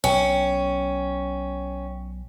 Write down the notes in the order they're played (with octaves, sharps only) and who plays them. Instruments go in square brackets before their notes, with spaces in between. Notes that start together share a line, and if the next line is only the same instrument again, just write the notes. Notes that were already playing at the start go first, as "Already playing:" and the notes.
[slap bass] B1 [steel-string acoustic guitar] C#4 [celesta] G5